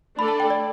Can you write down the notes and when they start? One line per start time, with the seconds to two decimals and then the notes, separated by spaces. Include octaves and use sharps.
0.19 A3 D4 A4 D5 B5
0.28 A5
0.40 G5
0.50 D5